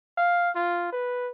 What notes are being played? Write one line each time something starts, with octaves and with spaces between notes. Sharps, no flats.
F5
F4
B4